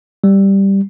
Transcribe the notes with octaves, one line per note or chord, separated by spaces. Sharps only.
G3